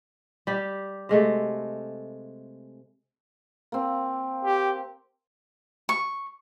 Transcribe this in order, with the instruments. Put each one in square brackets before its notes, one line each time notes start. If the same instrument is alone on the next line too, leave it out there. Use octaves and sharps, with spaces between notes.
[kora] G3 G4
C3 G#3 A3
[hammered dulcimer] A#3 C4
[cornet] G4
[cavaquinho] C#6